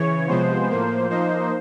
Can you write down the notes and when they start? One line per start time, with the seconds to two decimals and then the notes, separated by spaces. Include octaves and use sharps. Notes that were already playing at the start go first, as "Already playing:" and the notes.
Already playing: C#3 E3 C#5
0.27 C3 F3 G#3 B3 C5
0.69 A2 F3 A#3
1.10 F3 A#3 D#4 C5